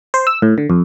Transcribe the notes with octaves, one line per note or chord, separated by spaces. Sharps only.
C5
E6
A2
D3
F2